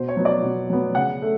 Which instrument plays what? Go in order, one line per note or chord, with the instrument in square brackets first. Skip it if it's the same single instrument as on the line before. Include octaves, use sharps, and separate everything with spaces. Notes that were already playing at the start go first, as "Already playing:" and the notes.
Already playing: [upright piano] B2 C5
C#5
F#3 B3
D5
B2
F#3 B3
C#3 F#5
A3